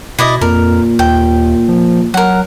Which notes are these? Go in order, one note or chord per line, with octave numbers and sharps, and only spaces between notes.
B2 E4 D5 D#5
F2 A#2 A#4
D#2 G5
F3
F#3 A#4 F#5